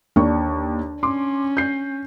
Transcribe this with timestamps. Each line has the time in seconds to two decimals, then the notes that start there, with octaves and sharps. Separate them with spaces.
0.16 D#2 D4 C#6
1.03 C#4 C6 D6
1.57 G6 C7